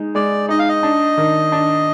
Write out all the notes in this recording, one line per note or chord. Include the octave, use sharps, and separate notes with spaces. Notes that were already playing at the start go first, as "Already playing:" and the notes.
Already playing: G#3 D#4
G#3 D5
D#4 D#5
F5
D#5
D4
D#3
D4